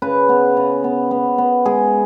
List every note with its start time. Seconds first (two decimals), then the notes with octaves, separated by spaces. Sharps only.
0.02 C#3 B4
0.29 B3
0.57 C#3
0.84 B3
1.11 B3
1.38 B3
1.65 G#3 G#4